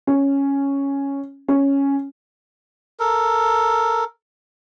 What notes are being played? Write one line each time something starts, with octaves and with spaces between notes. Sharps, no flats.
C#4
C#4
A4 A#4